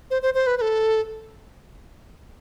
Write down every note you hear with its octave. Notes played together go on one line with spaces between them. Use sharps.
C5
C5
C5
B4
B4
A4